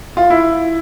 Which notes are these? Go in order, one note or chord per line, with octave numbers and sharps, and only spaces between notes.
F4
E4